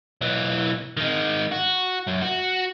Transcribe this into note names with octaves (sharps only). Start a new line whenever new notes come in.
B1 E3
D#3 G#3
F#4
F#2
F#4